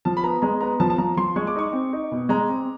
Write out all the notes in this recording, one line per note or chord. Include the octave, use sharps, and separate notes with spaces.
F3 A5
B5
B3 A#5
G#3 A#5
B3 A#5
F3 A5
A5
F3 A#5
F3 C6
G#3 C#6
D6
D#4 C#6
C4
D#4
B2
G#3 A#5
C4